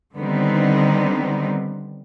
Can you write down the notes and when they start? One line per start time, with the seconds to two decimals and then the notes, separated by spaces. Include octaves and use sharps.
0.15 D3 D#3 G3 B3 C4 D#4